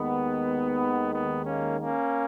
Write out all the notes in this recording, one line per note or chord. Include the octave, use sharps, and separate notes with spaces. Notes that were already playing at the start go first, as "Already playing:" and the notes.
Already playing: D#2 D#3 G#3 B3
B3
A#3 C#4
A#3 C#4